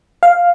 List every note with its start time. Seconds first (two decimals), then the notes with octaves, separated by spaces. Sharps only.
0.23 F5